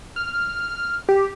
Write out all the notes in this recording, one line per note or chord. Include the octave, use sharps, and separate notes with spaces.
F6
G4